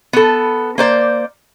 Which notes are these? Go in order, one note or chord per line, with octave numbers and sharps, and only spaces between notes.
B3 A4
A#3 C5 D5